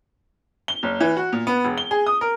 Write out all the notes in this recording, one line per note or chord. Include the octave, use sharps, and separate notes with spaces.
G7
F#1
E3
F#4
A#2
B3
E1
G7
G#4
D#6
A#4